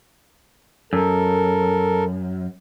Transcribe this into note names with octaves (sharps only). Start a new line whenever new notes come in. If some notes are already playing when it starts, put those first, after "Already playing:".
F#2 A4 A#4